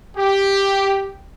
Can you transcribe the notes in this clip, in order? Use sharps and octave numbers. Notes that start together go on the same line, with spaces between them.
G4